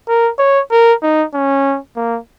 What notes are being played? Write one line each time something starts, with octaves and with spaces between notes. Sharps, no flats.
A#4
C#5
A#4
D#4
C#4
A#3